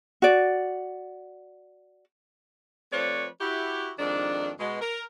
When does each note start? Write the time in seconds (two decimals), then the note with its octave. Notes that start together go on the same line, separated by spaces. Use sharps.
0.22 F#4 D5
2.92 F3 A3 C4 B4 C#5 D5
3.41 E4 F#4 G4
3.99 F2 G#2 D#3 D4
4.60 B2 G#3
4.81 A#4